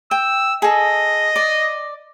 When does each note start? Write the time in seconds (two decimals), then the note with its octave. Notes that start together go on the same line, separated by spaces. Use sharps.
0.11 G5 E6
0.62 G#4 A4 D#5
1.36 D5